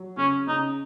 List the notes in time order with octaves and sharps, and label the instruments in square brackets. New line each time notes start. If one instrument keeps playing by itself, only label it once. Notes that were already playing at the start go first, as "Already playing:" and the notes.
Already playing: [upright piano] F#3
[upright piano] C#3 [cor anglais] C#4
[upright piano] C#3 [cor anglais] D#4